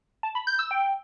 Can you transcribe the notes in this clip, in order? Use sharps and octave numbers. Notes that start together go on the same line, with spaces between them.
A5
B5
G6
E6
G5